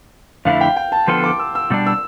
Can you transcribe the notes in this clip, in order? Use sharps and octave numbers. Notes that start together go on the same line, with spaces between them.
F2 D3 A3 E4 F5
G5
G5
A5
D3 F3 B3 F4 A4 C6
D6
E6
E6
B2 G3 D4
E6